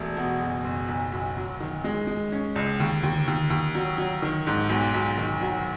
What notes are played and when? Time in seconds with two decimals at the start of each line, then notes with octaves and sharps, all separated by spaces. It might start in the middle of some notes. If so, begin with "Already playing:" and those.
Already playing: E1 A3
0.17 B2
0.41 F#1
0.64 F#1
0.88 B1
1.12 B1
1.37 F#3
1.60 D#3
1.84 G#3
2.07 G#3
2.32 C#4
2.56 C#2
2.80 D#2
3.03 D#2
3.27 D#2
3.50 D#2
3.75 F#3
3.98 F#3
4.22 D#3
4.47 G#2
4.69 B1
4.94 B1
5.18 D#3
5.41 F#3